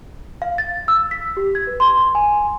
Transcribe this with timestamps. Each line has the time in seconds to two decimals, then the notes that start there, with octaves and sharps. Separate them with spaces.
0.42 F5
0.58 A6
0.88 E6
1.11 B6
1.37 G4
1.55 G#6
1.67 B4
1.80 C6
2.15 G#5